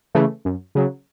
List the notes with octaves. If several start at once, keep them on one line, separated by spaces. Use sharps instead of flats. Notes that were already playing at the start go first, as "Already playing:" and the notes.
C#3 E3 A3
F#2
C#3 F#3